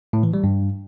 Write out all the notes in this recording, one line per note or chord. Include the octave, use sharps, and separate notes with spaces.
A2
E3
G3
G2